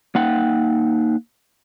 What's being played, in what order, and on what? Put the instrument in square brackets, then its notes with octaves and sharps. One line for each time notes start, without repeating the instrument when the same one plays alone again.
[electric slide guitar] A#3 D#4 F#5 G5